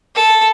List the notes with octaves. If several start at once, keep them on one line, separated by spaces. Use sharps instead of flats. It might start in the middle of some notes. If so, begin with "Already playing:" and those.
A4